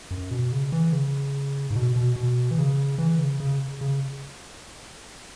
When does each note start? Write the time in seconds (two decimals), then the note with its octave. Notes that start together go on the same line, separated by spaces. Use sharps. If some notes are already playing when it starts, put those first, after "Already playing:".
0.11 F#2
0.31 B2
0.52 C#3
0.72 E3
0.93 C#3
1.71 G#2
1.76 B2
1.96 B2
2.16 B2
2.51 E3
2.58 C#3
2.98 E3
3.19 C#3
3.40 C#3
3.81 C#3